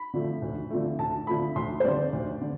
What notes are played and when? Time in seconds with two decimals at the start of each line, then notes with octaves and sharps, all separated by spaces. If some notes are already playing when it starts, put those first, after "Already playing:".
Already playing: B5
0.14 D3 F3 A3
0.42 D2
0.70 D3 F3 A3
0.99 D2 A5
1.27 D3 F3 A3 B5
1.56 D2 C6
1.80 C5
1.84 D3 G3 D5
2.13 D2
2.41 D3